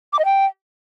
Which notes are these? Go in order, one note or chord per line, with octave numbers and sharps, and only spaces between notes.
D6
D#5
G5